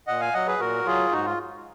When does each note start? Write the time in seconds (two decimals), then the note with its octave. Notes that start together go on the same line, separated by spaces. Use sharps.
0.07 A#2 D#5 F#5
0.20 F5 G#5
0.33 F#3 D#5 F#5
0.47 G#4 B4
0.59 A#2 F#4 A#4
0.85 F#3 F4 G#4
1.12 G#2 D#4 F#4
1.25 F4